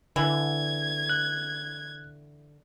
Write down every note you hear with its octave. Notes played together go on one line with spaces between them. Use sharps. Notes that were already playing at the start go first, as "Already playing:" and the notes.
D3 E3 G#6
F#6